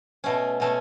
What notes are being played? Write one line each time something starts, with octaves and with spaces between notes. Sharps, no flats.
B2 A3 C#4
B2 A3 C#4